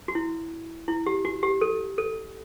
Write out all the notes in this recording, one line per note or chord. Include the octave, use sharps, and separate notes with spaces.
F#4
E4
E4
G4
F#4
G4
A4
A4